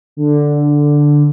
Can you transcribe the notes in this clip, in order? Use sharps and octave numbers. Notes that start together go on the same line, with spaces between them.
D3